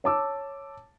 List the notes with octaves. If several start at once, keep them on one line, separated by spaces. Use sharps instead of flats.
C#5 A5 D6 E6